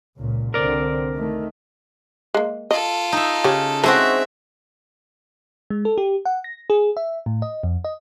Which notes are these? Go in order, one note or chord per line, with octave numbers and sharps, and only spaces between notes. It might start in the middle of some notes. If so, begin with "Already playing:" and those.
C#2 A#2
C2 D3 C4 A#4 D5
D#3 A3
G#3 A#3
F4 A4 D#5
D#4 E5
C#3 G4 C#5
E3 G#3 C4 F#4 A4 E5
G#3
A4
G4
F#5
A#6
G#4
E5
A2
D#5
F2
D#5